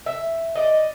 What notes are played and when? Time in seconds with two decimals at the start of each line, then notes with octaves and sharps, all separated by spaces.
0.06 E5
0.55 D5 D#5